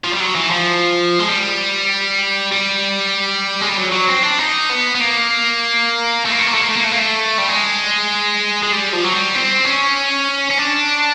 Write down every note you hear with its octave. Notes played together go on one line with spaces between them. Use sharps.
F3
G3
F#3
E3
F3
G#3
G3
G3
G#3
G3
F#3
F#3
C4
D4
D#4
B3
B3
A#3
A3
A#3
A3
A#3
A3
A#3
A3
A#3
A3
A#3
A3
G3
G#3
G#3
G3
F3
F#3
G3
C4
C#4
C#4
D4